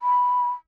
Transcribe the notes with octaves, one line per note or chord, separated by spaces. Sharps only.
B5